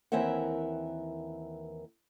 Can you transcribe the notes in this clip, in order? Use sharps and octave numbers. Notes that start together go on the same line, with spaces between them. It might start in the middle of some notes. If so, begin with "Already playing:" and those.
D#2 E3 C4 A#4 E5 F#5